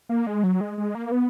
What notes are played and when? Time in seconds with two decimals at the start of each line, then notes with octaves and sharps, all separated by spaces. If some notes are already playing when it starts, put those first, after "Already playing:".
0.09 A#3
0.27 G#3
0.44 F#3
0.61 G#3
0.78 G#3
0.95 A#3
1.12 B3